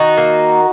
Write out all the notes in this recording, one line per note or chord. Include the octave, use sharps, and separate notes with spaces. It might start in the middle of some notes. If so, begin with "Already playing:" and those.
Already playing: D#3 D#4 F#4
A#3